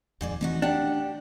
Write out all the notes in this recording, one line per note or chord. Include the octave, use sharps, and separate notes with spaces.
D#1 F2 G#2 G#4 D5
E3 F3 A3 C4 D#4 F#4
D4 G4 F#5